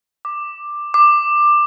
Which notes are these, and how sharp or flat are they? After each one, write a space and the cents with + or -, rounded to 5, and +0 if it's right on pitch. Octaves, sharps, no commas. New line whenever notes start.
D6 +10
D6 +15